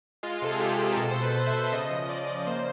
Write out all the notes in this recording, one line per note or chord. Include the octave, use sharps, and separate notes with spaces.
G#3 F4
C3 A4
G#4
C3 G4
C3
A#4
B2 A4
B2 C5
B4
B2
E5
B2
C#3 D#5
F3
D#5
C#3 D5
C#3
A#3 C5